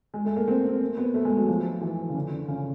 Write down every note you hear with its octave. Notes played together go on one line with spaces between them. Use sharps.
G#3
A3
A#3
C4
C4
B3
A3
G#3
F#3
F3
E3
C#3
D3
D3
C#3